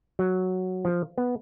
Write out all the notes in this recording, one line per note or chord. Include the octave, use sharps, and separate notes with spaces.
F#3
F3
B3